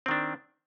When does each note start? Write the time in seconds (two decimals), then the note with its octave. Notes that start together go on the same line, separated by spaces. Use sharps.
0.06 C4
0.08 D#3
0.11 D4